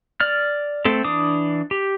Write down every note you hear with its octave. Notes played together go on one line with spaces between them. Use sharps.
D5 F6
A3 C4 A4
E3 D4 D6 D#6
G4